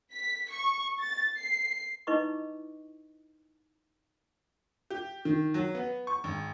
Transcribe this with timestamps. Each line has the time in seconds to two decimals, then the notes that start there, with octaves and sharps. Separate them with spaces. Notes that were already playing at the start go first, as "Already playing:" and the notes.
0.12 B6
0.53 C#6
0.99 A6
1.38 C7
2.07 D#4 E4 B4 D#5 C#6 D6
4.90 G4
5.25 D#3
5.54 F#3
5.75 B3
6.07 C#6
6.24 G#1